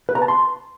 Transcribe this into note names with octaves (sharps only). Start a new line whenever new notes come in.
B4
A#5
A5
C6